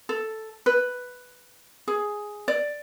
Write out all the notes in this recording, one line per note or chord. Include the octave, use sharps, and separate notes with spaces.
A4
B4
G#4
D5